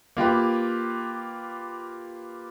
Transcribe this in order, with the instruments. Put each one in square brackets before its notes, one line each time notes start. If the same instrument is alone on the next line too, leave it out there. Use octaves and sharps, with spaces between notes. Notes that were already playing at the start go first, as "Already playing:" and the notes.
[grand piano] A#3 F4 G4 B4